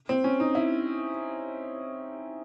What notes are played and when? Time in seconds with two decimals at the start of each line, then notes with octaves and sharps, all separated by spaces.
0.09 C4
0.24 C#4
0.40 D#4
0.55 E4